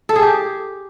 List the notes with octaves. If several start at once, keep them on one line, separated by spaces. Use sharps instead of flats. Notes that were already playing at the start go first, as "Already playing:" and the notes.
A4
G#4
G4